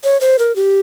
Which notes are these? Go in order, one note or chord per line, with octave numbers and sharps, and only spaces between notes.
C#5
C5
A#4
G4